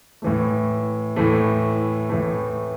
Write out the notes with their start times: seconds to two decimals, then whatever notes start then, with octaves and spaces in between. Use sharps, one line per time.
0.22 A2 E3 A3
1.16 A2 E3 A3
2.09 A2 E3 A3